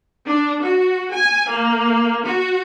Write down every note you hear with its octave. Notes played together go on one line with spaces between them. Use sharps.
D4
F#4
G#5
A#3
F#4